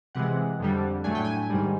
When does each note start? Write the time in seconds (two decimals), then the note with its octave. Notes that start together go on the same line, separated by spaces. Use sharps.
0.15 C3 E3 G#3 F#5
0.59 F2 D3 G3
1.04 A2 F#3 A3 D4 G#5
1.15 G5
1.25 G#5
1.50 G#2 D#3 G3